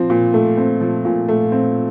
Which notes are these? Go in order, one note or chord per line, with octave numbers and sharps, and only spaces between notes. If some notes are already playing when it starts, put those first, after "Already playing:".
Already playing: F3 C4
A#2
A3
C4
F3
A#2
A3
C4